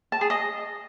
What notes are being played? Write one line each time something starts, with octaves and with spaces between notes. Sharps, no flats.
A5
G#4
D#5